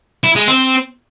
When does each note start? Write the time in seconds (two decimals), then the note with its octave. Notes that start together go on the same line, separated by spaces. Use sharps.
0.24 E4
0.35 G#3
0.47 C4